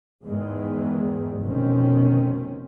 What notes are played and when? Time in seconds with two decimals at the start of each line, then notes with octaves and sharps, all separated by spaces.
0.25 E2 G#2 D#3 E3 G#3
1.41 F1 B2 D#3 C4 C#4